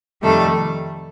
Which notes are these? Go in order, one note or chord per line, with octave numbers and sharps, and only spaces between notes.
F2 C3 D#3 G3 A3 A4